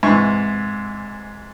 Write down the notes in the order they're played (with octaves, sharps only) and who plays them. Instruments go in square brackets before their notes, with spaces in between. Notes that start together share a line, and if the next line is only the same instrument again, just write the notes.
[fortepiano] G#2 C3 E3 C#6